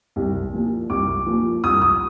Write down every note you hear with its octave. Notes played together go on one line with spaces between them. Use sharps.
C2
A#2 F3
C2 D6
A#2 F3
C2 D#6
D#6